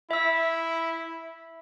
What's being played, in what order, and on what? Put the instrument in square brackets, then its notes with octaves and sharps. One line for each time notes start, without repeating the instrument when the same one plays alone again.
[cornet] E4 [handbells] E5 E6